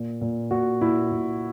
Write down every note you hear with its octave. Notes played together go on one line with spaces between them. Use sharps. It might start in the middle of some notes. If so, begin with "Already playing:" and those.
Already playing: A#2
A#2
A#2 F#4
A#2 E4
A#2